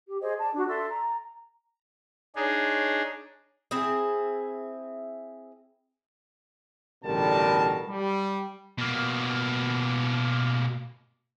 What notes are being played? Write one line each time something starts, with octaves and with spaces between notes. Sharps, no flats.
G4
G#4 C5 D#5
D5 A5
D4 F#4
A4 D5 E5 C6
A#5
D4 D#4 G#4 C#5
C4 E4 G#4
A1 B2 D3 G3 A#4 A5
G3
B2 A#3